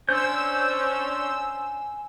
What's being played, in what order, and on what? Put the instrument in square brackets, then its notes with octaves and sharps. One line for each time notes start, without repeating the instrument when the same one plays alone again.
[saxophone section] C#4 D4 [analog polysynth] C5 E6 [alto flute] G#5 [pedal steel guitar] G6